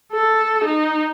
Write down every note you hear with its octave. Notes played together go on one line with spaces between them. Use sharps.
A4
D#4